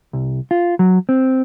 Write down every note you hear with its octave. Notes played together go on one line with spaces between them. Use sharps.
C2
F4
F#3
C4